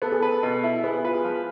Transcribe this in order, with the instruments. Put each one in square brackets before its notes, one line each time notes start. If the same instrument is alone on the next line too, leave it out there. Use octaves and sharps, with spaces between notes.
[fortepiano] B3 [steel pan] A4
[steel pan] G#4
[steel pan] A4 [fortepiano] B4
[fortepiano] B2 [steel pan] A4
[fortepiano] E4
[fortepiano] B3 [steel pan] G#4
[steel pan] G#4
[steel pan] F4 [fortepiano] B4
[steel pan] G#4
[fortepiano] F3